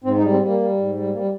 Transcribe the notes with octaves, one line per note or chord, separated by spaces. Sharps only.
G#2 C4
D#4
G3
C4
G3 A#3
G3
G#2
G3
G3 A#3